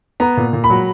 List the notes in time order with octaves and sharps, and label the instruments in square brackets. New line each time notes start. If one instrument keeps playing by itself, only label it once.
[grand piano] B3 [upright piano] A#5
[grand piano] A#2
A#2
[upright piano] B5
[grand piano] F#3